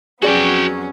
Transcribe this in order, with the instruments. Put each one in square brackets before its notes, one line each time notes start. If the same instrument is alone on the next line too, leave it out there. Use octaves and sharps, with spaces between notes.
[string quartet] F2 F#3 B3 [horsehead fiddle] C#4 [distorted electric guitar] F#4 G5 [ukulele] G#4 D5